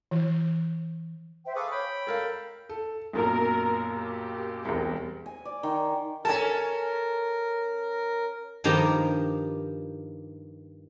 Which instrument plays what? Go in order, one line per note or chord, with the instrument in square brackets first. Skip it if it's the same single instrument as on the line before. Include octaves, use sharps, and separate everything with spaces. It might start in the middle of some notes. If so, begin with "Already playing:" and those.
[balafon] E3
[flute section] C5 E5 G5
[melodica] G#4 A4 B4 [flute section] F5 C#6 D6
[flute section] C#5 [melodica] G5 B5
[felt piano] A4 A#4 F5
A4
[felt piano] B1 F#2 A#2 [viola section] A#4
[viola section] G4
[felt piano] E1 C2
[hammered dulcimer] G#5
D5
D#3
[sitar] C#4 A4 [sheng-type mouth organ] A#4 [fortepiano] G#5 A5
[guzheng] G2 D#3 F3 G4 A#5